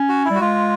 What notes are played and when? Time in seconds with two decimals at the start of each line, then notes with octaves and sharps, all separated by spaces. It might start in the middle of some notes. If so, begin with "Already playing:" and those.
Already playing: C#4
0.09 F#4
0.25 E4
0.30 G3
0.35 F#4
0.40 G#3 F4